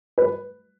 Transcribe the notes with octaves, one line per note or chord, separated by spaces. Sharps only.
B4